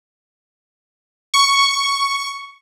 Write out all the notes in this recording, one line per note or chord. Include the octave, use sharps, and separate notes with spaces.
C#6